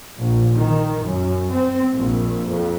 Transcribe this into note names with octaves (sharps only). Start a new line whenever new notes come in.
A#1
D#3
F#2
C4
A#1
F2